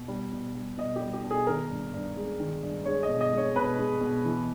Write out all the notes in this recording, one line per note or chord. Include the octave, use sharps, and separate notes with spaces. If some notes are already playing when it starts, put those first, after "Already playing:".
Already playing: B2
G3
B2
G3
B2 D#5
G4
G3
G4
B2
G#4
D#3 A#4
G2
G2
G#3
D#3
G2
G#3 C#5
D#5
B2
D#5
G#3 C#5
B2 B4
G#3
B2
E3